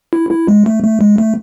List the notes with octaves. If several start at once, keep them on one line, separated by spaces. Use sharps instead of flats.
E4
E4
G#3
A3
A3
G#3
A3